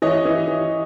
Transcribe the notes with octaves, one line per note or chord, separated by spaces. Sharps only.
E3 C#5 D#5
E3
E3